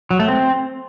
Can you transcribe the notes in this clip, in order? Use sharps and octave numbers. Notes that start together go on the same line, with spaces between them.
F#3
A3
C4